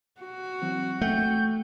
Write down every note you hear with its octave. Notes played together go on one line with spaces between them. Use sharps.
F#4
E3 F#3 C4
A3 E5 F#5 G5 G6